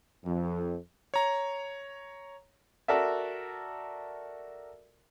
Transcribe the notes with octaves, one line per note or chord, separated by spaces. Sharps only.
F2
C#5 A#5
F#4 A4 A#4 D5 E5